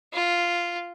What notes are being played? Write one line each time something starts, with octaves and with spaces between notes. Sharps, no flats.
F4